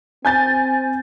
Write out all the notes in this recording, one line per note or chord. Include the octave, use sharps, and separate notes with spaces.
C4 G#5 G6 A6